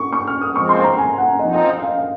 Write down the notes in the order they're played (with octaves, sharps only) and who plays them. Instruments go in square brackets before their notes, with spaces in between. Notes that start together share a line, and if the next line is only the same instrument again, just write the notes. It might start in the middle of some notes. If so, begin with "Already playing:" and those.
Already playing: [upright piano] C#6
C#6
F6
D#6
[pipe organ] F3 G#3 C4 [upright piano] C#6
[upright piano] C6
A#5
G#5
F#5
[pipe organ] F3 C4 D#4 [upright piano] D#5
[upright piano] D#5
D#5
F5
F5